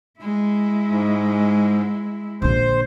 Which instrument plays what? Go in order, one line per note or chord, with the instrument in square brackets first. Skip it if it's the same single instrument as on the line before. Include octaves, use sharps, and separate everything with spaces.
[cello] G#3 E4
[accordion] G#2
[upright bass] A#1 D3 [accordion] C5